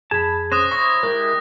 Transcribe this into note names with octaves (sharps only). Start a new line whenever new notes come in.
F2 G#4 A5 B5 G#6
C#4 C5 D#6 F#6 A#6
E4 C5 C#5 C#6 A#6
G#3 E4 G4 A#4